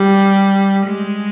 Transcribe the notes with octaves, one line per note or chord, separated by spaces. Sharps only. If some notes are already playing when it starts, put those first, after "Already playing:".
Already playing: G3
G#3